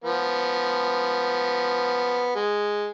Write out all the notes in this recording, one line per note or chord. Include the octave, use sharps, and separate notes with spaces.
F3 B3
G#3